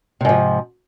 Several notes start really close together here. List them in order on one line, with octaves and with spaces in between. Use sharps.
C3 G#2 F3